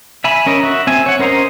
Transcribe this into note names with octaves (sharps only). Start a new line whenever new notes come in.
E5 G#5 B5
C#4 A#4 D#5
F#4 E5
C4 E5 G#5
C#5 F#5
C#4 A#4 C5 D#5 A#5